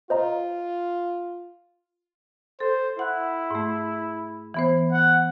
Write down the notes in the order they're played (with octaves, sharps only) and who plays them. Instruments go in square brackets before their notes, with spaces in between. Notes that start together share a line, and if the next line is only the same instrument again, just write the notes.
[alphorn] F4 [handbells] C5 D#5 A#5
[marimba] A4 [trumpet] C5
[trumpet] E4 [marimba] F#5 F#6
[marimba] G#2 A3
E3 B3 C5
[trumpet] F#5